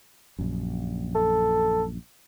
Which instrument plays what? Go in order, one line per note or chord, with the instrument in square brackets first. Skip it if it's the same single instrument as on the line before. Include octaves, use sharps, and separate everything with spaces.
[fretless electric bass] A#1 F#2
[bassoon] A4